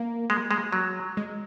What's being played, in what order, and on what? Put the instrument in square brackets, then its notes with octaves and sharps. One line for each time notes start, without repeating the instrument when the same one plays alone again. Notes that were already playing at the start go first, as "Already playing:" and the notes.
Already playing: [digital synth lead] A#3
[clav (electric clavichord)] G#3
G#3
F#3
[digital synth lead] G#3